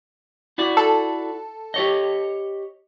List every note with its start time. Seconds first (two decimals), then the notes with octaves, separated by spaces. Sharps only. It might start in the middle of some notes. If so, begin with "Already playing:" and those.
0.58 E4 F#4 D5
0.77 A4
1.74 G4 C#5 D#5